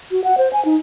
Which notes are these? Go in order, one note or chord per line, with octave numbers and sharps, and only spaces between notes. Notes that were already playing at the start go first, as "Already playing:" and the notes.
F#4
F#5
C5
G#5
D#4